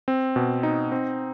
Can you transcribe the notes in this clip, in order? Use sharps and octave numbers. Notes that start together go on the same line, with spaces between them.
C4
B2
D#4
C4